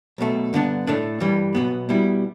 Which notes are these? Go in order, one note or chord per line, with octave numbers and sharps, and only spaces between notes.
B1 B2 A3
G2 D3 B3 D4
A2 A3 D4
G2 E3 G3
B1 B2 B3
B2 G3 E4